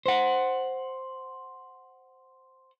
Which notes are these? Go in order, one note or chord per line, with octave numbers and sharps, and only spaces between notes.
C5 F#5